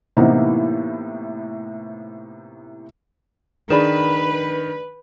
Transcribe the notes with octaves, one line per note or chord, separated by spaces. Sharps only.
A2 C3 E3 A#3 B3 D#4
D#3 D4 G#4 B4 D5 B5 E7